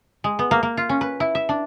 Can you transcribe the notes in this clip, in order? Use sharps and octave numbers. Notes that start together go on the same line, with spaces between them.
G#3
B3
A#3
A#3
F4
C#4
B4
E4
E5
D4